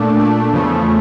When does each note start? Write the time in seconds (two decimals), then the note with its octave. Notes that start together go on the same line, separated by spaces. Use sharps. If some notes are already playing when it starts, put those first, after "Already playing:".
Already playing: A#2 A3 D4
0.17 A#2 A3 D4
0.52 E2 C#3 F3 A3